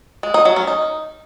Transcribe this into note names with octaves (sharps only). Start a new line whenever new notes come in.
G#3
D#4
F#3
C#4
D#4